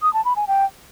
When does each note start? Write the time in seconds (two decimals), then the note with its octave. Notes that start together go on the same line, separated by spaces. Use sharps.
0.02 D#6
0.14 A5
0.25 B5
0.36 G#5
0.48 G5